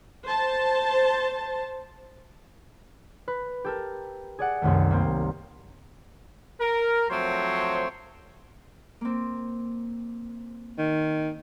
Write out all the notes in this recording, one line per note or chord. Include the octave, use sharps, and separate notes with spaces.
C5 A5
B4
G4 A4 A#4
G#4 D5 F#5
C2 F#2 D#3 A3
G3 A#3 C4
A#4
F3 F#3 A3 C4 C5 C#5
A#3 C4
D#3